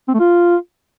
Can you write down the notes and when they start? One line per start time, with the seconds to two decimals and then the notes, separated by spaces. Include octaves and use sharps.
0.08 C4
0.14 A3
0.20 F4